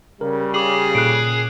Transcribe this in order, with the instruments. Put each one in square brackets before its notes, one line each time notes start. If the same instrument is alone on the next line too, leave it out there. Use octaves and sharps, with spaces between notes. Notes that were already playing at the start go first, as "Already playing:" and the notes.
[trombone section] C#3 G3 [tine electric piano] A#4
[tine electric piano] G4 [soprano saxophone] G#4 [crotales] D6 F#7
[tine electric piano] A#2 A4 [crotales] F#6 C7 D7